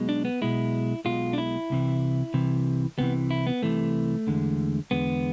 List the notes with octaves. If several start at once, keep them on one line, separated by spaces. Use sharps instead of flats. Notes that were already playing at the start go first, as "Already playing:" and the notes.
Already playing: B1 B2 G#3
D4
B3
B1 B2 G#3 E4
B1 B2 G#3 F4
D4
E4
C2 C3 E3
C2 C3 E3
C2 C3 E3 B3
E4
B3
C2 C3 E3 A3
E2 D3 G#3
E2 D3 G#3 B3